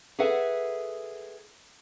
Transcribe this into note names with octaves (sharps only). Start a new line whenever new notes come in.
G#4 A4 B4 E5 F#5